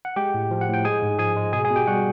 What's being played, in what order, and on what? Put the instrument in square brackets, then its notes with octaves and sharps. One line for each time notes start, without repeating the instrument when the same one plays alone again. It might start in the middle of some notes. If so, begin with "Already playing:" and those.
[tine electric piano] F#5
G#3 G4 G5
A2
F3
F#5
A2
G5
G#3 G#4 G#5
G#2
F3 G#4 G#5
G#3
B2 G#4 G#5
G#4 G#5
B2
G4 G5
G3 F#4 F#5